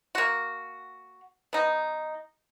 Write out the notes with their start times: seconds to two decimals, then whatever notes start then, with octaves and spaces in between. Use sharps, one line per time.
0.15 A#3 F#4
1.53 B3 D#4